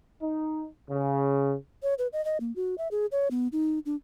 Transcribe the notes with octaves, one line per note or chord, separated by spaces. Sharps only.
D#4
C#3
C#5
B4
D#5
D#5
A#3
F#4
E5
G#4
C#5
B3
D#4
D4